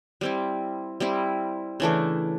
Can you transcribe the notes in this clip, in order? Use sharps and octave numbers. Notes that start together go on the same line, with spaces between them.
G3 C4 E4
G3 C4 E4
C#3 E3 A3 D4